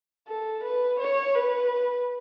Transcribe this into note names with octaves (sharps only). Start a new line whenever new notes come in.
A4
B4
C#5
B4